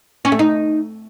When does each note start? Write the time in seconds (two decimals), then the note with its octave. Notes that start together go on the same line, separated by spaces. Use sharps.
0.25 C#4
0.32 A3
0.39 D#4